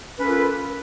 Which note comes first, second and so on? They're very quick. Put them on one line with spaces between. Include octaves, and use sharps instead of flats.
B4 C#4 A4 A#3 F4